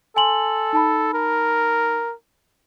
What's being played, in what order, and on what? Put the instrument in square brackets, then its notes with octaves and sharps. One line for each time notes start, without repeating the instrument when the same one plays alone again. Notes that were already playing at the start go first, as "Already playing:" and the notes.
[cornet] A4 [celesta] G#5 C6 F#7
[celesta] D#4 A5 B5
[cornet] A#4